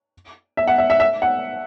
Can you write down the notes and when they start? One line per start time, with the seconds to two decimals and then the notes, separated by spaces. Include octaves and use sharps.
0.57 E5
0.68 F#5
0.78 E5
0.90 E5
1.00 E5
1.22 F#5